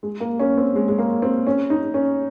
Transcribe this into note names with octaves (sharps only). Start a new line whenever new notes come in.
G#3
A#3
C#4
C4
G#3
G#3
A#3
C4
C#4
D#4
C#4